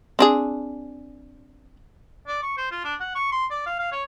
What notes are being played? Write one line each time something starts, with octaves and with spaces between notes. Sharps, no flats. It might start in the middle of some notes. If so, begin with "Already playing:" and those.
C4 D4 G#4
D5
C#6
C5
F4
D4
F#5
C#6
C6
D5
F5
F5
C#5